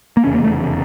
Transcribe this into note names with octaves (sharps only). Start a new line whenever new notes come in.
A#3
F1 E2 C#3 C#4
A#3
A3